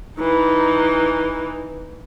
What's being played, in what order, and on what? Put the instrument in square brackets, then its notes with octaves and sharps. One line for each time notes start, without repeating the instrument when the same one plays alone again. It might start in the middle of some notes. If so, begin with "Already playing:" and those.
[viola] E3 D#4